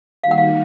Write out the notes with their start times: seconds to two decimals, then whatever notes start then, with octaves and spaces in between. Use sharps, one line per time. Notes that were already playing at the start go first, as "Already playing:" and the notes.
0.24 D#3 G3 A#3 D#4 F#4 F5
0.31 F#5
0.38 F5